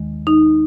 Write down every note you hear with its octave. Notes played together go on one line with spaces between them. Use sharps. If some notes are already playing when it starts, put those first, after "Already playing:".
Already playing: D#2 D#3 G#3
D#4